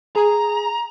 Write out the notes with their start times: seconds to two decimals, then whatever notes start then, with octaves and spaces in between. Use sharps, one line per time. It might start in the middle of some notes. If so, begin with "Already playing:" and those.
0.16 G#4 A#5